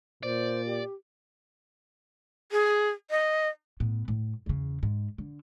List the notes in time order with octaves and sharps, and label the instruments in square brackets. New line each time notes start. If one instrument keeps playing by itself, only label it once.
[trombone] A#2 [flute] C5 [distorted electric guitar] D5
[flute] G4
[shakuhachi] G#4
D#5
[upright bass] A2 B3
A2
E2 C#3
G#2
D3